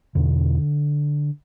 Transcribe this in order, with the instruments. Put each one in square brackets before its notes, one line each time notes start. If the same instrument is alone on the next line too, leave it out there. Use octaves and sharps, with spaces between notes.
[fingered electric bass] E2 B2 D3